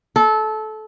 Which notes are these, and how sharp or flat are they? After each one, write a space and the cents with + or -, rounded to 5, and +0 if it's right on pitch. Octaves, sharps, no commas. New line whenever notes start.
A4 -20